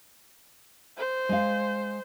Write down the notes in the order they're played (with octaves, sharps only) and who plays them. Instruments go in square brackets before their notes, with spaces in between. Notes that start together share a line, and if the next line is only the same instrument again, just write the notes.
[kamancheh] C5
[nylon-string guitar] G#3 F5